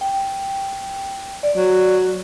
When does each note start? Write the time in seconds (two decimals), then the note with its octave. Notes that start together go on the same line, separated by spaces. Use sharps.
0.01 G5
1.43 D5
1.56 F#3